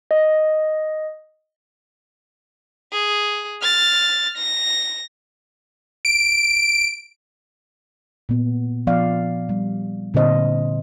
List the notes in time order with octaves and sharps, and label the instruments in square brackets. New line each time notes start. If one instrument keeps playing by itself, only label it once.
[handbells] D#5
[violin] G#4
F6 A6
A#6
[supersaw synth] D7
[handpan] A#2 B3
F3 B3 D5 F5
G3
A#2 D3 C4 C5 D#5